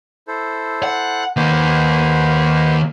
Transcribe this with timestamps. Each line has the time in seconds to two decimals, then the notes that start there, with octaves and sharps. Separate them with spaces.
0.28 E4 A4 C5
0.83 F#5
1.37 D#3 A#3 B4 C5 F#5